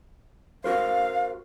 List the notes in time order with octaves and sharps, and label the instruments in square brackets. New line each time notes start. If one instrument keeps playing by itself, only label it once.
[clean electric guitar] F#4 A#4 C5 [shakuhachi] F5